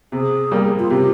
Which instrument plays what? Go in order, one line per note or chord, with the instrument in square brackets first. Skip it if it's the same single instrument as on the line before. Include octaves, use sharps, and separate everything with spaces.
[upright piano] C3 [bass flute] G#4
[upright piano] G3 A#3
[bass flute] F4
[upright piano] C3 [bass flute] G4